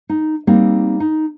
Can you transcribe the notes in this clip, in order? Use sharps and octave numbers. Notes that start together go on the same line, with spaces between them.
D#4
G3 A#3 C4 D#4
D#4